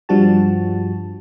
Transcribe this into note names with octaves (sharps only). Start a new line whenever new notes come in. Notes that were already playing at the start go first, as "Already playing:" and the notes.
G2 F3 G3 F#4 A5